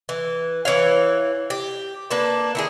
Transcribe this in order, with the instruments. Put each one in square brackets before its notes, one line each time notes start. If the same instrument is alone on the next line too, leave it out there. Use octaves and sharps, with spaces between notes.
[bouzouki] E3
E3 C#5 F5
G4
A#3 D4 B4 A5
D#3 E4 G#4